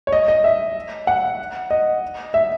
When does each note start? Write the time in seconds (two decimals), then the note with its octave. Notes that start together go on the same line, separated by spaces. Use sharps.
0.07 C#5
0.12 D#5
0.28 D#5
0.44 E5
1.07 F#5
1.71 D#5
2.34 E5